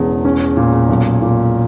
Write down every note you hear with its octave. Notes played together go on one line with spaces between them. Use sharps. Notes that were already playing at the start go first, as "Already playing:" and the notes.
Already playing: E1 E2 C#3
C#4
A#2
B1
A#2